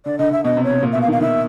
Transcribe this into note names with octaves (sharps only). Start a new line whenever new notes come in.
D3 D5
D3 D#5
D3 E5
B2 D#5
C3
C#5
C3
A#2
B2 E5
F5
D#3
F5
D#3 E5